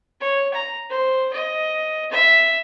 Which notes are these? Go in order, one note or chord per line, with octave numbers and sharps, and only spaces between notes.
C#5
A#5
C5
D#5
E5